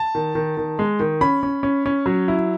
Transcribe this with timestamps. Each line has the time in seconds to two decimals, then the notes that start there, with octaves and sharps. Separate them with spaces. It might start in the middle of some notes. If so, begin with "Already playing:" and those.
Already playing: A5
0.15 D#3
0.35 D#3
0.57 D#3
0.79 G#3
1.00 D#3
1.21 C#4 B5
1.43 C#4
1.63 C#4
1.86 C#4
2.06 F#3
2.28 E4